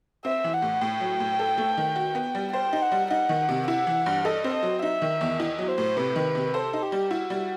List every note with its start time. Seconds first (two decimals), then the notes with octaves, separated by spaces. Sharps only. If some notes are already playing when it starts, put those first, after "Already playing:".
0.25 C4 E5
0.44 E3
0.53 F#5
0.62 A2
0.81 A2 G5
1.00 F#3
1.20 A2
1.39 A4
1.58 A3
1.78 D#3
1.96 F#4
2.15 B3
2.35 G3
2.53 C5 G5
2.73 D#4
2.82 F#5
2.92 G3
3.11 D#4 F#5
3.29 D#3
3.49 C3
3.68 E4 F#5
3.87 E3
4.06 G2
4.25 A4 D#5
4.44 C4
4.53 D#5
4.63 F#3
4.82 D#4 E5
5.02 D#3
5.21 E2
5.39 E4 D#5
5.58 F#3
5.68 C5
5.78 A2
5.96 C3 B4
6.16 D#3
6.35 C3
6.54 A4 C5
6.73 D#4
6.82 G4
6.92 G3
7.11 E4 F#4
7.30 G3